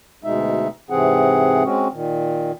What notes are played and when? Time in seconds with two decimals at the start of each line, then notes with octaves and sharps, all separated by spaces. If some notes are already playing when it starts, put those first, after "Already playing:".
0.24 D2 B2 G#3 D#4 E5
0.90 G#2 C3 E3 C4 G#4 F#5
1.65 G#3 C4 C#4 F#4
1.92 A#2 D#3